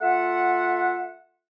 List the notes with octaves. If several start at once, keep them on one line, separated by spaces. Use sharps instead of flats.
A3 F4 E5 F#5